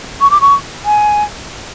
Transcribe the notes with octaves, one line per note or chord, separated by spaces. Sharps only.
C#6
D6
C#6
G#5